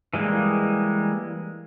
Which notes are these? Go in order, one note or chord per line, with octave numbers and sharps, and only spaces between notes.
E3 G3 G#3 A#3